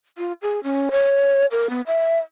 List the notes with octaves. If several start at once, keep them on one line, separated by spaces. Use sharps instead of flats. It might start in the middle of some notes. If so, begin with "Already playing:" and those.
F4
G#4
C#4
C#5
A#4
B3
E5